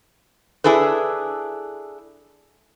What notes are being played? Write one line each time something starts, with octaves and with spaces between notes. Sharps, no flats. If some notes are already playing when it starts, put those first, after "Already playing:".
D4 E4 G#4 A4 B4